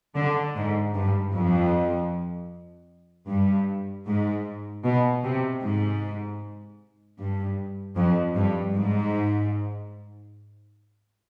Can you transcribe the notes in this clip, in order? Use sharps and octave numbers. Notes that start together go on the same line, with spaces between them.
D3
G#2
G2
F2
G2
G#2
B2
C3
G#2
G2
F2
G2
G#2